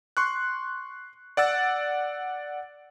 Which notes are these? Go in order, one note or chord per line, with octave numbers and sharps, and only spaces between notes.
C6 C#6 F#6
D5 F#5 E6 A6